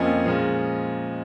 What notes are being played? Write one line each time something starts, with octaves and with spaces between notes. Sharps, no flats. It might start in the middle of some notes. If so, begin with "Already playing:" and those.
Already playing: F2 F3 A#3 C#4 D#5 G#5
A#2 F3 G#3 C#4